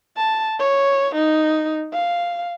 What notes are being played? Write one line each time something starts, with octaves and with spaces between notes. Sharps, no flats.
A5
C#5
D#4
F5